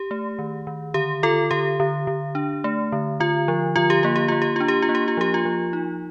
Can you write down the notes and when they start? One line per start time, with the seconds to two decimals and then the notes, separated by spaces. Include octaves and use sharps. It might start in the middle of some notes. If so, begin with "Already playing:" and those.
Already playing: G4
0.11 A3
0.39 D#3
0.67 D#3
0.94 D3 G4
1.23 D3 F4 A4
1.51 D3 G4
1.80 D3
2.07 D3
2.35 D4
2.64 A3
2.92 D3
3.20 D3 F4
3.48 F3
3.76 D3 F4
3.90 G4
4.03 A#3 F4
4.16 G4
4.28 A#3 F4
4.42 G4
4.56 D4 F4
4.68 G4
4.82 F4
4.89 A#3
4.95 G4
5.08 F4
5.17 F3 G4
5.34 F4
5.45 F3
5.73 D#4